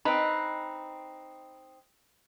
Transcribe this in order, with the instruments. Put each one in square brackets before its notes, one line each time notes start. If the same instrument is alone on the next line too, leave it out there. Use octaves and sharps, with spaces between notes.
[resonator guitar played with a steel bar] C4 D#4 [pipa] B4